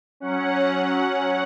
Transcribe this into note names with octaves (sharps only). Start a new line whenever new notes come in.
F#3 C#4 F#5